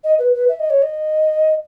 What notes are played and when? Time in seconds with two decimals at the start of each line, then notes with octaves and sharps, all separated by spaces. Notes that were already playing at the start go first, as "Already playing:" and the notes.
0.04 D#5
0.18 B4
0.34 B4
0.48 E5
0.59 D#5
0.70 C#5
0.82 D#5